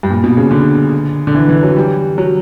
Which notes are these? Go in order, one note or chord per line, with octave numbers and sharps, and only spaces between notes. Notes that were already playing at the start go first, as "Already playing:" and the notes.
G2
A#2
B2
C#3
D3
D3
E3
E3
F#3
G3
F#3